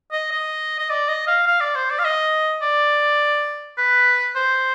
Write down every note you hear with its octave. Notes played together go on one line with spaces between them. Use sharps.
D#5
D#5
D#5
D5
D#5
F5
F5
D5
C5
D5
F5
D#5
D5
B4
C5